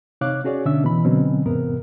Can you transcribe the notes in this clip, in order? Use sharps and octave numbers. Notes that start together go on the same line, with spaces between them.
C3 D#4 C#5 F5 D6 F#6
C#4 F#4 G#4 C#5 D5
B2 D3 C#4 D4 E5 E6
B2 E3 B5
B2 D3 F#3 C4 C#4
E2 G#2 C3 B3 A#4